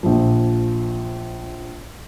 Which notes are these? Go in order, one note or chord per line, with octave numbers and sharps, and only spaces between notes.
A#1 F3